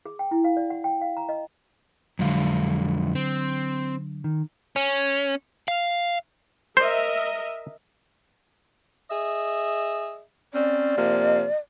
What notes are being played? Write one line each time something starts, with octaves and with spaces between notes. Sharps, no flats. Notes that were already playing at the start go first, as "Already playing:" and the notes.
G#4
G5
E4
F5
D5
F#5
G5
F5
A#5
D#5
F2 D3 F#3 G#3 F5
C4
D#3
C#4
F5
A#4 C5 D#5 E5
G#4 D#5 E5
C4 C#4 D5
C3 F3 A#3